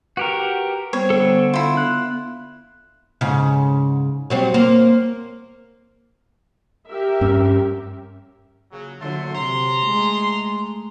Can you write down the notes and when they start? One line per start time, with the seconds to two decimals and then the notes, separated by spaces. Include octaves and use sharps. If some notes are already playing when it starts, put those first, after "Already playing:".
0.17 F#4 G4 A#4 B4
0.93 G3 B3 C5 C#5
1.10 D3 A4
1.53 B3 E4 F4
1.77 F#6
3.21 G#2 C#3
4.30 F#3 G3 C4
4.54 A#3 C5
6.89 G4 A#4 E5
7.21 G2 C#4
8.72 A#2 C#3 F#3
9.01 A#2 D3 F#3 A3 C6
9.35 C3 A#5 C6
9.86 G#3 A3